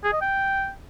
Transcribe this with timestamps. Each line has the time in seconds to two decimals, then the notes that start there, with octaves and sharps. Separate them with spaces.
0.04 G#4
0.13 D#5
0.21 G5